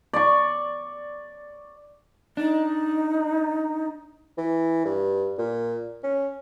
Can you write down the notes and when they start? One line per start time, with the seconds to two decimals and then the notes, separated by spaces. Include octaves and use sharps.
0.13 D5 C#6
2.37 D4 D#4
4.38 E3
4.85 G2
5.38 A#2
6.04 C#4